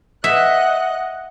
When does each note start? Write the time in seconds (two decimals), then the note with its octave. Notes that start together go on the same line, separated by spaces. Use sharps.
0.24 D#5 E5 F#5 F#6